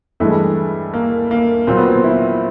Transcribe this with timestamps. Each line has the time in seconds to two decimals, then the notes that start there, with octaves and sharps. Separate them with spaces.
0.20 G2 E3 G#3 A3
0.94 A#3
1.31 A#3
1.67 A#2 F#3 C4
1.77 B3
1.87 C4
2.04 E4